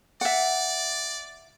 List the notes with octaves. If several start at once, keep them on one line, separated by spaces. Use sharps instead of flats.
D5 E5 F#5